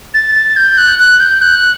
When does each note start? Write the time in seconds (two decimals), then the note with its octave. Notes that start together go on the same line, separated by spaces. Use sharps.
0.14 A6
0.35 A6
0.56 G6
0.78 F#6
0.99 F#6
1.20 G6
1.42 F#6